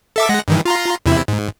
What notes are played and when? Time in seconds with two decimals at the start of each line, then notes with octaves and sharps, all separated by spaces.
0.16 A4 E5 D6
0.29 G#3 F#5 A#6
0.48 G2 D#3 E3
0.65 F4 A#5 C6
1.06 E2 C3 E4
1.28 G#2